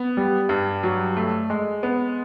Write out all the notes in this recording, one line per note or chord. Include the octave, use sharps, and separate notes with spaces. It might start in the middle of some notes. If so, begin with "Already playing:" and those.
Already playing: B3
G3
G2
F#3
A3
G#3
B3